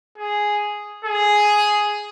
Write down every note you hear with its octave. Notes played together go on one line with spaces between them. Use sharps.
G#4
G#4